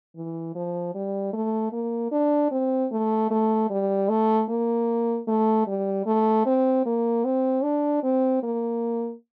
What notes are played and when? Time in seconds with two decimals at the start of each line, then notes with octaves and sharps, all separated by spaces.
0.16 E3
0.55 F3
0.95 G3
1.33 A3
1.73 A#3
2.12 D4
2.51 C4
2.92 A3
3.31 A3
3.70 G3
4.09 A3
4.49 A#3
5.28 A3
5.67 G3
6.06 A3
6.46 C4
6.86 A#3
7.24 C4
7.63 D4
8.03 C4
8.43 A#3